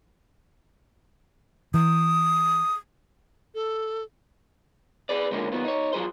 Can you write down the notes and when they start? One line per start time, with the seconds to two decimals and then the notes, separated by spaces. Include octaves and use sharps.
1.74 E3 D#6
3.55 A4
5.09 G#4 B4 D5
5.31 C#2 D3 F3 G#3 A#3 C#4
5.52 D#3 F#3 B3 F4
5.64 D#4 C#5
5.93 F3 F#3 G#4 C5